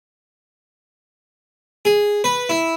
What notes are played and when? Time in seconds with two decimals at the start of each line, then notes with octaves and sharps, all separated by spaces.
1.85 G#4
2.24 B4
2.49 E4